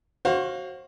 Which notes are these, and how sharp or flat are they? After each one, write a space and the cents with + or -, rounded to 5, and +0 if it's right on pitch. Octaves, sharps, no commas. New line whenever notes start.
F#4 +5 C5 +35 F5 +0